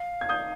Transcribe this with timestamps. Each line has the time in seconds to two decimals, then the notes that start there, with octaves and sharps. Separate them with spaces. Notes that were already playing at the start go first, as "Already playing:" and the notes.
Already playing: F5
0.21 G#6
0.29 D#6 G6